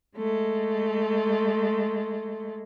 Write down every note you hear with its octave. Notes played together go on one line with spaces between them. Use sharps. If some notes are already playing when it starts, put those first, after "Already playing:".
G#3 A3